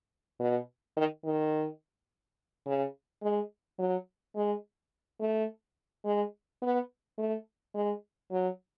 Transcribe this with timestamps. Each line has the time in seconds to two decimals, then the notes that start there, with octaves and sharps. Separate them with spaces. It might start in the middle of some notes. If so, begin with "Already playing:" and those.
0.40 B2
0.97 D#3
1.25 D#3
2.66 C#3
3.23 G#3
3.79 F#3
4.36 G#3
5.21 A3
6.05 G#3
6.62 B3
7.18 A3
7.75 G#3
8.31 F#3